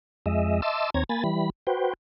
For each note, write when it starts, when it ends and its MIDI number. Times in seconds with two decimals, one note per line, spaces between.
0.26 0.61 41
0.26 0.61 56
0.26 0.61 75
0.26 0.61 76
0.62 0.90 75
0.62 0.90 76
0.62 0.90 81
0.62 0.90 84
0.62 0.90 86
0.62 0.90 88
0.94 1.04 39
0.94 1.04 60
0.94 1.04 73
0.94 1.04 82
0.94 1.04 92
1.09 1.24 58
1.09 1.24 80
1.09 1.24 83
1.09 1.24 93
1.24 1.50 52
1.24 1.50 55
1.24 1.50 83
1.67 1.93 66
1.67 1.93 71
1.67 1.93 72
1.67 1.93 79